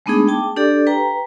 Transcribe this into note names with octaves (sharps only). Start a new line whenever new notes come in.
G#3 A3 B3 D4 D#4 G#4
G5 A5 D6
D4 G4 A4 D5
B4 G5 A#5